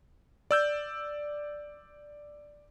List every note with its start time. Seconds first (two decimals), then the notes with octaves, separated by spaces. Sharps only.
0.51 D5 E6 G6